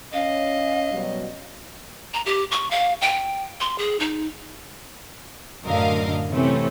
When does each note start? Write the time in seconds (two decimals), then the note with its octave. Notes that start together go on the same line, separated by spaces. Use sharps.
0.13 C#4 D#5 F5
0.92 B2 F#3 G3
2.14 A#5
2.26 G4
2.51 C#6
2.71 F5
3.02 G5
3.61 C6
3.78 G#4
4.00 D#4
5.63 F#2 A2 D3 A#4 D#5 F5
6.31 C3 E3 A3 C4 C#4